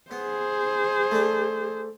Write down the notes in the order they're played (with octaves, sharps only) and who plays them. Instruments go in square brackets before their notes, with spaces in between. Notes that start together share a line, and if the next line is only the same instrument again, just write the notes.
[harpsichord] B3 [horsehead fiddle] G#4 C5
[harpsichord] A3 D4